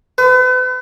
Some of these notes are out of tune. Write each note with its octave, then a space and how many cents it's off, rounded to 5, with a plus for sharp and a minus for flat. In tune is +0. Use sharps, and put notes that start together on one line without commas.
B4 +40